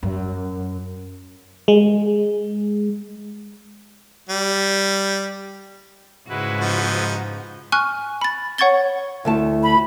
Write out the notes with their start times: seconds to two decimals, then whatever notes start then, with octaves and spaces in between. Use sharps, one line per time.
0.03 F#2
1.68 G#3
4.30 G3
6.29 G#2 C#3 G#3 E4 F#4 B4
6.61 F3 D#4
7.72 G#5 C#6 F6 F#6
8.21 B5 A6
8.58 C#5 F#5 C#6 G#6 A6 G7
9.25 D2 A3 E4 A5
9.62 B5